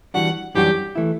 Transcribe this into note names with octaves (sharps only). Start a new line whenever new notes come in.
E3 G3 D4 F#4 F#5
F#2 E3 G3 D4 F#4 G4
E3 A3 E4